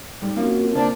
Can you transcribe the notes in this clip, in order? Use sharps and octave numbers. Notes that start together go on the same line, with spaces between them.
A2 G3 D#4
A#3 C4 C#4 F4 F#4 A#4 F5
C#3 A#3 D4 C5 D5